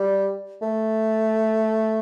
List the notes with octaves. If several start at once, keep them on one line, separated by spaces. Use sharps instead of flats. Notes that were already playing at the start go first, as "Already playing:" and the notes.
Already playing: G3
A3